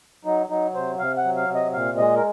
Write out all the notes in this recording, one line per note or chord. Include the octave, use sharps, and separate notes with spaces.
F#3 D#4
F#3 D#4
C3 C5
C3 F5
F#5
F#3
F5
C3
D#5
A#2 F5
G#3 D#5
A#4